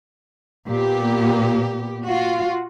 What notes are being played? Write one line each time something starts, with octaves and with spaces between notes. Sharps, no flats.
A#2 B3 G4
F4 F#4